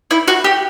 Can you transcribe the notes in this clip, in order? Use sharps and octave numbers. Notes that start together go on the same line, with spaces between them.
E4
F#4
G4